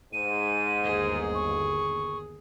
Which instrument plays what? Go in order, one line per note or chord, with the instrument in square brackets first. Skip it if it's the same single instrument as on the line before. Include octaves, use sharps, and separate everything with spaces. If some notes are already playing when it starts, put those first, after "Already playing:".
[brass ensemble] G#2 [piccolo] D#7
[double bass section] G1 D#2 [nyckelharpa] G#4
[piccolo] C#6